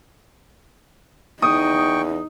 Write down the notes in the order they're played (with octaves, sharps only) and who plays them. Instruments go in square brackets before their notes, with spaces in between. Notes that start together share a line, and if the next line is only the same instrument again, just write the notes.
[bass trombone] E2 [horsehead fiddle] D#4 [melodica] G5 C#6 [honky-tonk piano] D#6